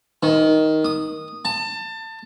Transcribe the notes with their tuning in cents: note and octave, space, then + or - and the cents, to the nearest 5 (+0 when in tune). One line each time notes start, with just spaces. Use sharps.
D#3 +10
D#6 -10
A5 +25